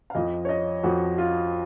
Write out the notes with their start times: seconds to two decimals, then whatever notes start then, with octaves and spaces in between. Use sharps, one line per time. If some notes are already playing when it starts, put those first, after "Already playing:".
0.10 F5
0.15 F2 F3 D#5
0.45 C#5
0.49 D#5
0.83 F2 F3 F#4
1.18 F4